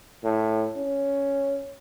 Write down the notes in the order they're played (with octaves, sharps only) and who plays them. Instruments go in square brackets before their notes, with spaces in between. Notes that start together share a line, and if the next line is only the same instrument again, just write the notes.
[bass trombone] A2
C#4